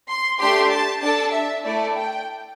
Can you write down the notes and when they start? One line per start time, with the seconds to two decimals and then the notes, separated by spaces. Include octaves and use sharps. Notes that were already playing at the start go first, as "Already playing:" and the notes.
0.10 C6
0.40 A3 D4 G4 C6
0.72 A5
1.03 D4 A4 A5
1.34 E5
1.65 A3 E4 A4 D5
1.97 G5